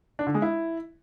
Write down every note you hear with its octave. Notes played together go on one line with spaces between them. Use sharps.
D4
D3
G#3
E4